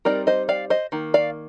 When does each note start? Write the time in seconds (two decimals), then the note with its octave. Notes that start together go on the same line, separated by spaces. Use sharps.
0.05 G3 C4 D#4 A#4 D5
0.27 C5 D#5
0.49 D5 F5
0.70 C5 D#5
0.92 D#3 A#3
1.14 D5 F5